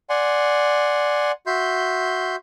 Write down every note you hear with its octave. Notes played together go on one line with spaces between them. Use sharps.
D5 F#5 G#5 C6
F#4 E5 C6 G6